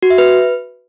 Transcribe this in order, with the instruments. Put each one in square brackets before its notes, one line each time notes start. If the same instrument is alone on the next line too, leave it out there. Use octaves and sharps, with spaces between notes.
[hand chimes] F#4
E5
B4